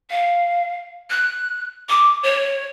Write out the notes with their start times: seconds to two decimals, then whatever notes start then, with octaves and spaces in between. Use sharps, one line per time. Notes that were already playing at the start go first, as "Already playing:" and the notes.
0.10 F5
1.10 F#6
1.89 D6
2.23 C#5